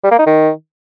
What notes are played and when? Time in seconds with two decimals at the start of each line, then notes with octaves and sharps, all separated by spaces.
0.04 G3
0.11 A#3
0.19 D#4
0.26 D#3